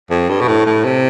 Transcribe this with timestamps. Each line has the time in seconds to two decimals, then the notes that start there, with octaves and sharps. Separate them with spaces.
0.10 F2
0.29 G2
0.41 B2
0.48 A2
0.66 A2
0.84 C3